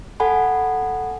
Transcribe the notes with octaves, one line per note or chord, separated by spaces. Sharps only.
A4 F#5 G#5 B5